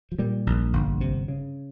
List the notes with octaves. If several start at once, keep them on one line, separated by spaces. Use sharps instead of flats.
F3
A#2 G3
A#1
G1
C3
C#3